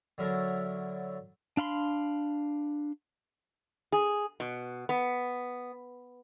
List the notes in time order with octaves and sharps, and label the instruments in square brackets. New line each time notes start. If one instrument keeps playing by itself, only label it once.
[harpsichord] D3 F#3 E4 A#4 E5 A5
[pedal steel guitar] D4 F5 B5 C6
[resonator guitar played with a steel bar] G#4
B2
B3